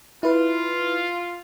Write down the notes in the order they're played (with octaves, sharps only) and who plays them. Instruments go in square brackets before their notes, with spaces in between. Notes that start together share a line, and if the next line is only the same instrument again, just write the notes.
[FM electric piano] E4 B4 [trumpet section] F4